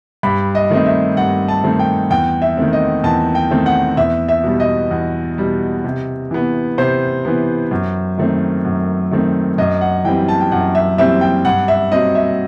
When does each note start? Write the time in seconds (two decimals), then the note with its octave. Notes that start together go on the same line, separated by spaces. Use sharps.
0.23 G2 B5
0.55 D#5
0.70 D#3 A3 C4 D#5
0.86 E5
1.17 G2 F#5
1.48 A5
1.64 D#3 A3 C4
1.79 G5
2.10 E2 G5
2.42 E5
2.57 D#3 A3 C4
2.73 D#5
3.04 E2 A5
3.35 G5
3.51 D#3 A3 C4
3.66 F#5
3.97 E2 E5
4.28 E5
4.43 B2 G3
4.60 D#5
4.91 E2
5.38 B2 G3
5.84 C3
6.31 E3 B3
6.78 C3 C5
7.25 E3 B3
7.71 F#2
8.18 D#3 A3 C4
8.65 F#2
9.11 D#3 A3 C4
9.58 F#2 D#5
9.81 F#5
10.05 E3 G3 C4 G5
10.28 A5
10.41 G5
10.51 F#2 F#5
10.75 E5
10.98 E3 G3 C4 E5
11.21 G5
11.45 G2 F#5
11.68 E5
11.92 F#3 C4 D#5
12.15 E5